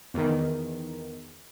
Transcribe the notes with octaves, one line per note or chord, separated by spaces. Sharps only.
E2 D#3